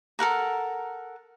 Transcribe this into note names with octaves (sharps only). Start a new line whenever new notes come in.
A4 A#4 F#5 A#5